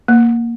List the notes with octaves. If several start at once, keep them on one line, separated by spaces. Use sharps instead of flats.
A#3